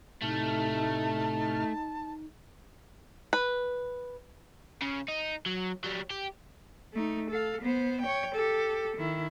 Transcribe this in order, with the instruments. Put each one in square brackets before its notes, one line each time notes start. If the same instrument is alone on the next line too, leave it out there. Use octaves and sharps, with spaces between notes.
[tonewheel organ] A2 C3 F6 [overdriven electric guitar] A3 [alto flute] D#4 [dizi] A5
[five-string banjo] B4
[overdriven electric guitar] C#3
D#4
F#3
F#3 G3
G4
[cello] A3 D#4
A4 F5
B3 C5
C#5 G5
G4 A4
D#3 E4